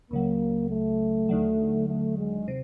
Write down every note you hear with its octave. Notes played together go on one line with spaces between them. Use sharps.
C#2 C#3 F#3 A#3
A3
D#2 D3 F#3
A3
G#3
C3